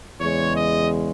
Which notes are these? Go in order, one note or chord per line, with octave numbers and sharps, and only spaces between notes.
E2 C#3 G#3 C#5
D#5